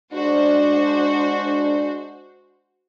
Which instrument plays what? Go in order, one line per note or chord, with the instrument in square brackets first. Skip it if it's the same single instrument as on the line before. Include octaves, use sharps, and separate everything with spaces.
[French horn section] G#3 D4 [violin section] F#4 C5